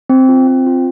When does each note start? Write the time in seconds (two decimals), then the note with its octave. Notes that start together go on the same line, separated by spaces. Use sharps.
0.10 C4
0.29 F4
0.47 C4
0.66 F4